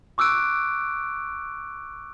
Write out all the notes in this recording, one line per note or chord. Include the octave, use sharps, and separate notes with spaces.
C#6 D6 E6 F#6 D7